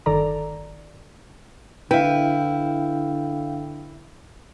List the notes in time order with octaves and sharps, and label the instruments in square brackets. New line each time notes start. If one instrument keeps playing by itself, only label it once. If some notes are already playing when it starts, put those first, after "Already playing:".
[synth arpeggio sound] G1 D#3 A4 D5 A#5
[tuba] D3 [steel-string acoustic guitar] E4 E5 [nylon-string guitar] B4 [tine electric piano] F5 G5